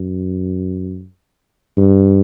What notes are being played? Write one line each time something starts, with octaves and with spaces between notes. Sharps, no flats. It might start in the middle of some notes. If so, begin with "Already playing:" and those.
Already playing: F#2
G2